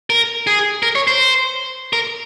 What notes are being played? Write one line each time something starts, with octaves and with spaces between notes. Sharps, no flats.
A#4
G#4
A#4
C#5
C5
A#4